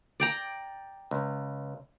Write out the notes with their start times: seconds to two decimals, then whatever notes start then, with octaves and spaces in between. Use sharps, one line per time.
0.20 D5 G5 A#5
1.11 C#2